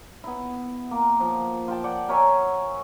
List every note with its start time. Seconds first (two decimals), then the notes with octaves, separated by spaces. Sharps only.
0.24 B3 E4
0.91 A#3
1.20 F3
1.68 F4 G5 A5
1.84 D5 F#5 G5
2.09 A#4 C#5 E5 G#5